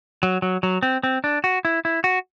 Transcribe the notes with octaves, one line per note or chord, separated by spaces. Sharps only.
F#3
F#3
F#3
C4
C4
D4
F#4
E4
E4
F#4